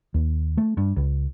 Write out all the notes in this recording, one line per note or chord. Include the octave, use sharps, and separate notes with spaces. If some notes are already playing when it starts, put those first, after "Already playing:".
D#2
A3
G2
C#2